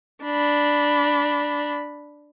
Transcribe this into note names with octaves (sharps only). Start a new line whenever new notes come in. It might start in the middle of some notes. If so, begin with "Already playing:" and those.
D4 B5